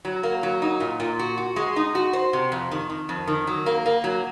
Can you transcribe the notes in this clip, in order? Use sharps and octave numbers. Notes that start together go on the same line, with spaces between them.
F#3
A#3
F#3
D#4
A#2
A#2
F#4
F#4
G#3
D#4
F#4
C5
C3
F2
D#3
D#3
F2
D#3
F#3
A#3
A#3
F#3